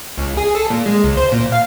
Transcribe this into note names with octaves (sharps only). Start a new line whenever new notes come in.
C#2
G#4
A4
A#2
G#3
C#2
C5
A#2
F5